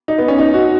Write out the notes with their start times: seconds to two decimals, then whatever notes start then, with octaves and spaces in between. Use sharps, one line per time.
0.08 D#4
0.18 B3
0.28 C#4
0.39 D#4
0.54 F#4